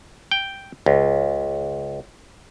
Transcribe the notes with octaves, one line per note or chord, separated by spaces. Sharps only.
G5
C#2